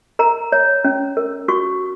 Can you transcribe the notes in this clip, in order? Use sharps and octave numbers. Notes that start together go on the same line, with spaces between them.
A#4 A#5
C#5
C#4
A#4
F#4 C#6